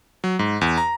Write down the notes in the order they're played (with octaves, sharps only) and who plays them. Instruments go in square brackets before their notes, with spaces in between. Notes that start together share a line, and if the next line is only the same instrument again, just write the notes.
[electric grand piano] F#3
G#2
E2
A#5